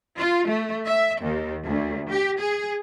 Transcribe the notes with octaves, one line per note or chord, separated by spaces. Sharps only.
F4
A3
E5
D#2
D2
G4
G#4